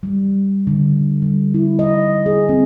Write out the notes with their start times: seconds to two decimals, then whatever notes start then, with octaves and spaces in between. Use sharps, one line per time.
0.03 G3
0.67 D3
1.22 G3
1.54 E4
1.79 D#5
2.26 G#4
2.49 C4